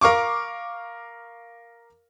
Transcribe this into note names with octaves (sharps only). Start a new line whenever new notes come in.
A#4 F5 C#6 D6